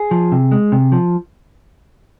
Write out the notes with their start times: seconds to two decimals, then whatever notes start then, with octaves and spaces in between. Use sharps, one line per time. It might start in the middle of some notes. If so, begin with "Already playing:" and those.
Already playing: G#4
0.11 F3
0.32 C3
0.52 G#3
0.72 C3
0.92 F3